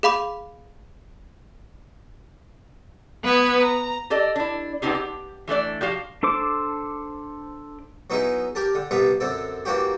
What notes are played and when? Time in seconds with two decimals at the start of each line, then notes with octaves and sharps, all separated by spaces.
0.03 G#4 F5 B5 D6
3.23 B3 B4 G#6
3.61 A#5
4.10 G4 A4 D5 D#5
4.36 D4 E4
4.82 B3 C4 D4 D#4 G4 G#4
4.95 G4
5.47 E3 A3 D4 D5
5.81 F3 F#4 G4 F5
6.23 D4 A4 C5 D6
8.10 F#3 B3 D#4 E4 G#4
8.55 G4 A#4 A5
8.75 D3
8.91 C2 G3 B3 E5 A5 A#5
9.20 F#2 D3 C4 A4
9.65 E3 A#3 D4 F#4 G4